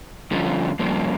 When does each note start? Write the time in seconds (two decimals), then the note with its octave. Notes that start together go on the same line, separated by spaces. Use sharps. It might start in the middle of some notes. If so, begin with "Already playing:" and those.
0.31 G2 D3 F3 C#4 F4
0.79 G2 F3 A#3 C#4